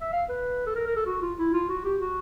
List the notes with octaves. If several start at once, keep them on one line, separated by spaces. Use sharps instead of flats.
E5
F5
B4
A4
A#4
A#4
A4
F#4
F4
E4
F4
F#4
G4
F#4